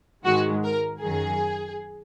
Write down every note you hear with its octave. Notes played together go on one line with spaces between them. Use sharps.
G#2 D#3 G#3 F#4
A#4
F#2 D#3 F#3 G#4